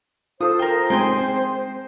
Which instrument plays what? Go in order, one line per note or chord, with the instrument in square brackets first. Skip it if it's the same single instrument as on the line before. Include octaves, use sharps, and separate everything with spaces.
[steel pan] F4 A4 [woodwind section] C5 [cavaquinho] D#6
[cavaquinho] A#4 G5
[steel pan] G#3 C4 G#4 [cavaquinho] G5 G#5 C6